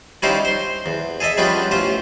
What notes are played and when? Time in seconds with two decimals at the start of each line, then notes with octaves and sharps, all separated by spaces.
0.22 G3 C#4 D#4 E4 C5 F5
0.45 C5 C6
0.86 E2
1.20 G#4 A4 D#5 E5
1.38 F3 G3 B3 C#4 D4 F4
1.71 A1 C#4 F4 C5